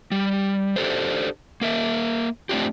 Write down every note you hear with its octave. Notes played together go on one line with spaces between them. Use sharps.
G3
D4 G4 A4 C5
A#3 A#4 E5
A3 C4 D4 F4 G4